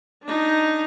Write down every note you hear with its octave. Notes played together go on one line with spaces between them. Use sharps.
D4 D#4